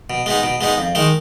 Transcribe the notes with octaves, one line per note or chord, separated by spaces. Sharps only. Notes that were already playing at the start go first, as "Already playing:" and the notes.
B2
G#3 B3 D#4
B2
G#3 B3 D#4
F2
D#3 G#3 D#4